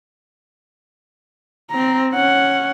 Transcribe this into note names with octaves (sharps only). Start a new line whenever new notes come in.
C4 A#5
C#4 F#5